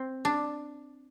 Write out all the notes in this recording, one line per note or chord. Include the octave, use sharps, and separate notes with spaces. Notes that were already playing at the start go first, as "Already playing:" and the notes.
Already playing: C4
D4